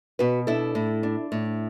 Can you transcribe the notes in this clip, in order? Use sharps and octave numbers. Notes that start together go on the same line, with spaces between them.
B2 F#4 B4
D4 E4 A4
A2
D4
A2